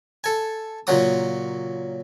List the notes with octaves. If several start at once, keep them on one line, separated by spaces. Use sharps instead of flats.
A4 G#5
A#2 C#3 F#3 D#6